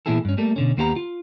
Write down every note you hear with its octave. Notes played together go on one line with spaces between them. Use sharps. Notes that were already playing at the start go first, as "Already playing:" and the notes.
A#2 E3 B3 E4 G#4 A4
G2 C#4
G3 A3 A#3 A4
B2 D3 C#4
D#2 A#3 B3 G4 F5 A#5
F4